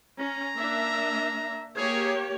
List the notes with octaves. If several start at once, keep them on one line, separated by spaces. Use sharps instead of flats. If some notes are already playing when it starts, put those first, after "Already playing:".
C#4 A#5
A#3 D4 E5
A#3 G4 G#4 C#5